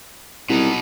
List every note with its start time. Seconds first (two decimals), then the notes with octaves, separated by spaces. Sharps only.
0.50 C2 B2 D#4